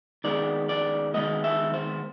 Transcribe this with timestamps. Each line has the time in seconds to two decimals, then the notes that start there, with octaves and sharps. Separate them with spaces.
0.24 D#3 G#3 B3 D5
0.69 D5
1.14 D#3 G#3 B3 D#5
1.44 E5
1.74 C5